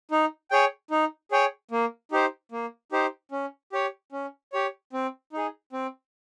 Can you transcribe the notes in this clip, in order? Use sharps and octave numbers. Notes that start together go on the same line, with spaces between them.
D#4
G#4 C#5 G5
D#4
G#4 C#5 G5
A#3
D#4 G4 C5
A#3
D#4 G4 C5
C#4
G4 C#5
C#4
G4 C#5
C4
D#4 G#4
C4